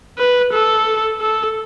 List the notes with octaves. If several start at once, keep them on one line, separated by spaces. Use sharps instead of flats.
B4
A4
A4